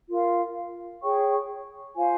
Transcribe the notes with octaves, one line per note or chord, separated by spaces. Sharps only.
F4 A#4 F5
G#4 C#5 G5 C#6
F4 C5 F5 G#5